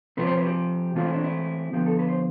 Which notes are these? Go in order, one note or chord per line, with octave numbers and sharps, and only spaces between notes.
C3 F3 C4 B4
C5
B4
G4
E3 A3 C4 F4
E4
D4
E4
D3 F3 B3 G4
A4
B4
C5